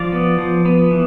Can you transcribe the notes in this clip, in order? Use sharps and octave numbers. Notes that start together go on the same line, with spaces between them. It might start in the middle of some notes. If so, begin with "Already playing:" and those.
Already playing: F3 D5 F5
B3
F3
B3
E3